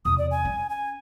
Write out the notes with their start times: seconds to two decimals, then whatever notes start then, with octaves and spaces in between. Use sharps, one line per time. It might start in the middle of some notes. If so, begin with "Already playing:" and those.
0.05 E2 C3 D#6
0.18 D5
0.31 G#5
0.45 C#4
0.70 G#5